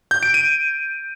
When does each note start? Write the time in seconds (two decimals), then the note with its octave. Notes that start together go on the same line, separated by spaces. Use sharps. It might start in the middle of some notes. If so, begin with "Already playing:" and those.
0.11 G6
0.23 D7
0.34 D#7